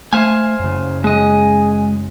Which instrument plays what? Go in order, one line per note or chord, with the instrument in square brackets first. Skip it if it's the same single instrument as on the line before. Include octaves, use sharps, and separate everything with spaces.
[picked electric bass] A3 [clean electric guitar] C5 F5 G#5
[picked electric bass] F#2 C#3
[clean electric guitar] G#3 D#5 [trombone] G#4